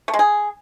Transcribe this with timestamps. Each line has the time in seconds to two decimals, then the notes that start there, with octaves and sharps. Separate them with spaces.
0.08 A3
0.14 G#3
0.19 G#4